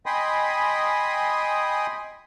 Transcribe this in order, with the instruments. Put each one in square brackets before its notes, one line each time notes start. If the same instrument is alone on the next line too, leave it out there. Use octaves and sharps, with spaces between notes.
[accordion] D#5 G5 G#5 B5 C6 D#6